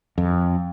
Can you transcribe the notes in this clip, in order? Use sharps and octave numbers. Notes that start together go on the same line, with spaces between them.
F2